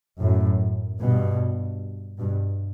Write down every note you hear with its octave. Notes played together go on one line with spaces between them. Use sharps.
F#2 A2
G2 B2
G2 B2